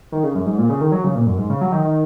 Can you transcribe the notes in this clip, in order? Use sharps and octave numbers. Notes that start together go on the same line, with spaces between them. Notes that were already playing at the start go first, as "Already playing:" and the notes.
D#3
C#3
F#2
G#2
A#2
C#3
D#3
F#3
C#3
A#2
F#2
G#2
C#3
F#3
D#3
D#3